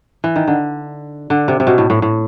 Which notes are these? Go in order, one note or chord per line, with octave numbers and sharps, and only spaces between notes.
E3
D#3
D3
D3
C3
C3
B2
A2
A2
A2